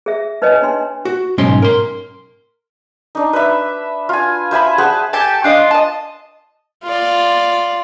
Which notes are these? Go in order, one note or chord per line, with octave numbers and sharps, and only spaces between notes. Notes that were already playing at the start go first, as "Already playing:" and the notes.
G#4 E5
D#4 B4 C#5 D#5 G#5
D4 D#4 C6
F#4
B1 G#2 C#4 C6
A#4 C6
D4 D#4
B4 E5
F4 G#5
C5 E5 G#5 B5
G#4 C5 F#5 A5
G4 A4 G#5 A5
D4 F4 D#5
D#5 A5
F4 D5